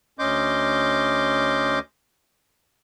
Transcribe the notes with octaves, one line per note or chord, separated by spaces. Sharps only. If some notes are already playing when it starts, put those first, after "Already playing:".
D2 C#4 D#5 C6 D6 G6